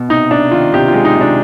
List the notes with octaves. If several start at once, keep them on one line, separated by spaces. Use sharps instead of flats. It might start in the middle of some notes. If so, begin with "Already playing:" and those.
Already playing: B2
C3 D#4
C3 D4
D#3 F4
C3 G4
F4
G#3
D#4
C3
D4